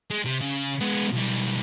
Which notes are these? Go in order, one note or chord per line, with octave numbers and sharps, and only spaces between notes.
G#3
C3
C#3
G#3 B3
B1 G3